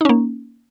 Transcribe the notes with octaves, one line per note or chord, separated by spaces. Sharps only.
A#3 C#4 D#4